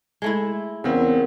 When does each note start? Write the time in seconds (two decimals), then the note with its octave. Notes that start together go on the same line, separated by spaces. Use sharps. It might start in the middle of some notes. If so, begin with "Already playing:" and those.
0.22 G#3 A3 E4
0.84 E2 C#3 C4 A#4 F5 F#5